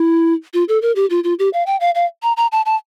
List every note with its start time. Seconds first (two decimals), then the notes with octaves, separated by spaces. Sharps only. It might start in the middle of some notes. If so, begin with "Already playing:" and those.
Already playing: E4
0.54 F4
0.69 A4
0.82 A#4
0.96 G4
1.10 F4
1.24 F4
1.39 G4
1.53 F5
1.66 G5
1.80 F5
1.95 F5
2.23 A#5
2.37 A#5
2.52 A5
2.66 A5